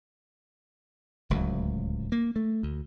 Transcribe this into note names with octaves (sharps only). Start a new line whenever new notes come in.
D1 C#2 A2 F#3
A#3
A3
D2